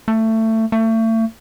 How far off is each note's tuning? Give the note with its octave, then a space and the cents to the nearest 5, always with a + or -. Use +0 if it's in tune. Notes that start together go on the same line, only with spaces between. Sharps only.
A3 +20
A3 +35